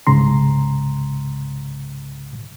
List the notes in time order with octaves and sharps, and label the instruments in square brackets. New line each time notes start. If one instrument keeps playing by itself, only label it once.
[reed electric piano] C2 G#2 C#3 A#5 C6